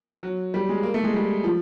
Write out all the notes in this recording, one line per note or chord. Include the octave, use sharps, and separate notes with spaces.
F#3
G3
G#3
A#3
A3
G#3
G3
F3